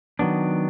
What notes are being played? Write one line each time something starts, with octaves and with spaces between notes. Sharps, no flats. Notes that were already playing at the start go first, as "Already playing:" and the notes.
D#3 F#3 B3 D4